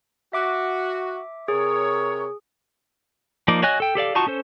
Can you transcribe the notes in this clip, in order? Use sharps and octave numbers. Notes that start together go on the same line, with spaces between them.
F#4 E5 D6
C3 G#4 A#4 C#5
F3 A#3 D#4 D5
F#4 C#5 D#5 G#5 F#6
A4 G5
G4 A4 D5 F5
D#4 F4 F#4 A5 C#6
C#4 A4 C5